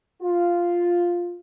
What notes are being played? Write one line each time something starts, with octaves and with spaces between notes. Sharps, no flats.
F4